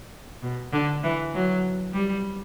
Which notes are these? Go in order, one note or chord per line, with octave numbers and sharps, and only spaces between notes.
B2
D3
E3
F#3
G3